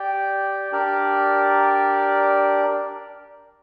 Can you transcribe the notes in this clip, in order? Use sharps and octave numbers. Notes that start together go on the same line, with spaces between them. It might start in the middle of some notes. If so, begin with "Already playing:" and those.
Already playing: G4 D5 G5
D4 G4 A#4 D5